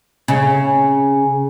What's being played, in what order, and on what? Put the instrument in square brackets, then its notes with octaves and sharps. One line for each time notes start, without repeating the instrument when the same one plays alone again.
[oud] C#3